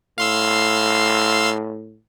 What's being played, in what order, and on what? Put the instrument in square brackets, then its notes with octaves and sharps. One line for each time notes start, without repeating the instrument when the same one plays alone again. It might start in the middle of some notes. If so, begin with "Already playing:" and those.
[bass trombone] A2 [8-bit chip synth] F5 C6 E6